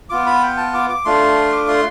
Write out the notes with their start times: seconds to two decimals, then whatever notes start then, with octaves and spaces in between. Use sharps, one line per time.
0.10 B3 F4 D6
0.26 B5
0.42 G5
0.57 A5
0.74 D6
0.90 D6
1.05 A3 D4 F4 C6
1.52 D6
1.68 C6